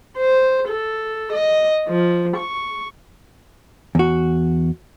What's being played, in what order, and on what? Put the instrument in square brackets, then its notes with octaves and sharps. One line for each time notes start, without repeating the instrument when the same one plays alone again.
[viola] C5
A4
D#5
F3
C#6
[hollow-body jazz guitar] E2 F#4